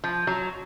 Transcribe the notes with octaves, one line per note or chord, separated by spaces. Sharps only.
F3
F#3